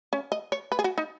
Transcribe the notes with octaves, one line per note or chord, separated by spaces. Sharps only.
C#4
D#5
C#5
B4
G#4
F#4
D#4